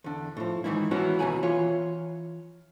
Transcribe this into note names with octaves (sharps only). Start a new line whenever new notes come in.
E2 D3
A2 F3
G#2 D#3 E3 G#3 E4
E3 F#3 B3 C#4 E4
D#2 B2 E3 G#5 A#5 B5
E3 F4 C#5